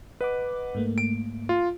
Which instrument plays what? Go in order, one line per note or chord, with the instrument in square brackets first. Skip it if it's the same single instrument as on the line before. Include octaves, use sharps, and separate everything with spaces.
[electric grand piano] B4 [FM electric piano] D#5 F#5 D6
[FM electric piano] G#2 A3 A#3
[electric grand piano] D7
F4